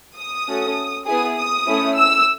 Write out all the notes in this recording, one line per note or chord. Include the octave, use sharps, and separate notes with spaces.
D#6
A3 C#4 F#4 A4
B3 E4 G#4 D#6
D#6
A3 C#4 E4
E6